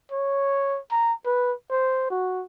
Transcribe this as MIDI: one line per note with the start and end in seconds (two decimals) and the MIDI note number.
0.12 0.79 73
0.91 1.13 82
1.25 1.53 71
1.71 2.06 72
2.11 2.44 66